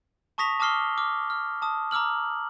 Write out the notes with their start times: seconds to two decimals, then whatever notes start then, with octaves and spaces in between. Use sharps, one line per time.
0.38 A5 C#6 D#6 A#6 B6 F7
0.60 A5 D6 D#6 F6 C7 G7
0.98 D6 F6
1.30 F6
1.62 A5 D#6
1.91 A#5 D6 E6 F6 F#7